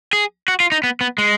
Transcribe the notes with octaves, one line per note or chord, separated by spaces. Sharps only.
G#4
F#4
F4
D#4
B3
B3
G#3